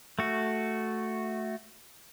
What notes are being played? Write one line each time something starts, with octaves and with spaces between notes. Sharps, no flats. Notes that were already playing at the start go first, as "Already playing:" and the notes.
A3 F#4